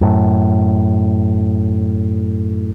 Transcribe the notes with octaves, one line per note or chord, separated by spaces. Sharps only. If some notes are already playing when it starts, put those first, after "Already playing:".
F#2 A2